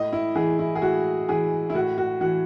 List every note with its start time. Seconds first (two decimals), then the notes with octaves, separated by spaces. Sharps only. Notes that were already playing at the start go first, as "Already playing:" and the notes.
Already playing: A2 D#5
0.13 E4
0.35 E3 G#4
0.59 E4
0.75 G#4
0.82 A2 F#4
1.29 E3 G#4
1.70 E4
1.74 A2 F#4
1.98 F#4
2.21 E3 F#4